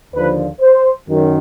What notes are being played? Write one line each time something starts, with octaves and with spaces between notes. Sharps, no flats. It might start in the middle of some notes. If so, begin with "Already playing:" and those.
D#2 D3 F3 B4
C5
F#2 D#3